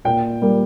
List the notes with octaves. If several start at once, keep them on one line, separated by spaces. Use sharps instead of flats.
A#2 G5
G3 A#3